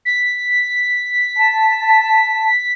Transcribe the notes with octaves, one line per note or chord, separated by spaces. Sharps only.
B6
A5